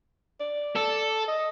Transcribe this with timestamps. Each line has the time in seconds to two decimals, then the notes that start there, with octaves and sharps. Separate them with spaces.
0.40 D5
0.76 A4
1.28 D#5